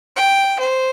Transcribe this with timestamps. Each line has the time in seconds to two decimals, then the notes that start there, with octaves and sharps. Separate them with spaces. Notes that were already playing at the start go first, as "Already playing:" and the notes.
0.16 G5
0.59 C5